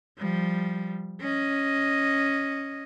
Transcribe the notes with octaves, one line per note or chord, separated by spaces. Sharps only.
F3 G3
C#4 D#5